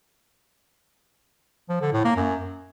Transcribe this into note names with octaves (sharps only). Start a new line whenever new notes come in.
F3
D3
A2
A#3
F#2